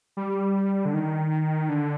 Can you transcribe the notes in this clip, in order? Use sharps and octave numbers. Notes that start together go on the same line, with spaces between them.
G3
D3
D#3
D3